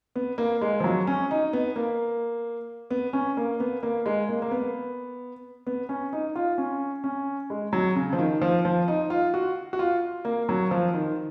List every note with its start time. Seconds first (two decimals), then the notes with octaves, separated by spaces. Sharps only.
0.16 B3
0.38 A#3
0.61 G#3
0.80 F3
0.84 F#3
1.07 C#4
1.31 D#4
1.53 B3
1.76 A#3
2.90 B3
3.13 C#4
3.37 A#3
3.60 B3
3.83 A#3
4.06 G#3
4.29 A#3
4.42 A#3
4.51 B3
5.67 B3
5.89 C#4
6.13 D#4
6.36 F4
6.58 C#4
7.04 C#4
7.50 G#3
7.73 F#3
7.96 C#3
8.13 F3
8.18 D#3
8.41 F3
8.65 F3
8.88 D#4
9.10 F4
9.34 F#4
9.73 F#4
9.79 F4
10.25 A#3
10.49 F#3
10.71 F3
10.94 D#3